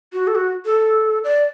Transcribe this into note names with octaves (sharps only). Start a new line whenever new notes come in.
F#4
A4
F#4
A4
D5